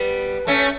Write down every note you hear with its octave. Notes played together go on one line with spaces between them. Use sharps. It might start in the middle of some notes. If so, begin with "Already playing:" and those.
Already playing: G3 B3
A3 C#4